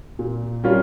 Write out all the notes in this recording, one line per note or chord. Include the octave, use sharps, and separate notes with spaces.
A#2
G3 C#4 F4 A#4